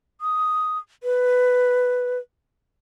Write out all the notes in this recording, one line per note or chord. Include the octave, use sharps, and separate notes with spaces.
D#6
B4